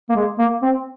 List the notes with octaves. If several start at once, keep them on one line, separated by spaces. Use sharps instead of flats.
A#3
G#3
A#3
C4